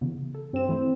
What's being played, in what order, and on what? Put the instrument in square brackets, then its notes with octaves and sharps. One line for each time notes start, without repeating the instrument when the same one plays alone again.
[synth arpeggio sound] C#3 E3 B3
A4
[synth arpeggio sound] G2 E7 [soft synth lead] C4
[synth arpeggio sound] E3 A3 E4